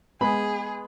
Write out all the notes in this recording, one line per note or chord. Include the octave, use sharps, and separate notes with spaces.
G#3 B3 G#4 B5